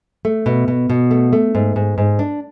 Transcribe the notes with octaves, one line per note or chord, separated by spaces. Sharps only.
A3
B2
B2
B2
A3
A3
G#2
G#2
G#2
D4